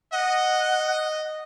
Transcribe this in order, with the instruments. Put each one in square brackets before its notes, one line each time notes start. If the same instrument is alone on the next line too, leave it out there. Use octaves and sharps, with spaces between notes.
[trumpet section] D#5 [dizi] F#5